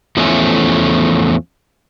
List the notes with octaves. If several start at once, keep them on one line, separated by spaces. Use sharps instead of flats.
E2 F3 A3 C#4